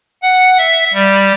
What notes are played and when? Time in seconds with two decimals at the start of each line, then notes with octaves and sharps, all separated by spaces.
0.23 F#5
0.58 E5
0.94 G3